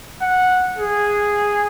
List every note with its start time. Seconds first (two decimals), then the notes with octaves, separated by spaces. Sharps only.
0.22 F#5
0.78 G#4